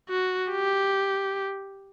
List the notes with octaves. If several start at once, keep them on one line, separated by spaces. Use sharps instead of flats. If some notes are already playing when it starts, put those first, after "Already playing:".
F#4
G4